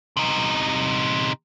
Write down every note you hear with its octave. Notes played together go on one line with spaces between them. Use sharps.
C3 D#4